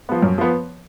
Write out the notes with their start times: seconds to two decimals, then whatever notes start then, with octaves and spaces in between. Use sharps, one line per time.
0.09 F3 B3
0.22 F#2
0.38 F3 B3